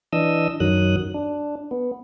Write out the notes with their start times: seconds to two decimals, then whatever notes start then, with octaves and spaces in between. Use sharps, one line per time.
0.13 E3 D4 D#5 D#6 E6
0.60 F#2 D#3 F#3 D#6 F#6
1.14 D4
1.71 B3